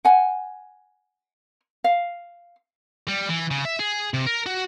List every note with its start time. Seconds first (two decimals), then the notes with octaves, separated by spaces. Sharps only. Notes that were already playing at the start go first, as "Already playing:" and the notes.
0.05 F#5 G#5
1.84 F5
3.08 G3
3.29 E3
3.51 C#3
3.65 E5
3.80 G#4
4.14 C3
4.26 A#4
4.46 F#4